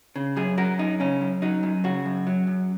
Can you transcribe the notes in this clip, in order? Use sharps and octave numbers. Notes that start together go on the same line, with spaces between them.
C#3
F#2 G#4
F#3 A#4
F#2 D#4
C#3 C#4
F#2
F#3 D#4
F#2
C#3 F#4
F#2
F#3
F#2